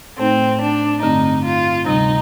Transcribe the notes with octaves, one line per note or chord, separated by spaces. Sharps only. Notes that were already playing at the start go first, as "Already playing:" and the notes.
A2 A3 C4 D#4
D4
G2 D3 A3 C4 D#4
F4
D2 C3 G3 D#4